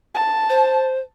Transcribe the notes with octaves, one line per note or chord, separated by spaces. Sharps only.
A5
C5